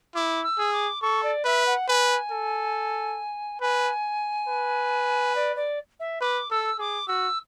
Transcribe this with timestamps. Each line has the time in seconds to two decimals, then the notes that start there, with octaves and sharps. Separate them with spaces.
0.15 E4 D6
0.43 E6
0.58 G#4
0.73 D6
1.02 A4 C#6
1.23 D5
1.45 B4 E5
1.66 F#5
1.88 B4 G#5
2.31 A4
3.61 B4 G#5
4.48 B4
5.35 D5
5.56 D5
6.00 E5
6.21 B4 D6
6.51 A4 E6
6.79 G#4 D6
7.08 F#4 E6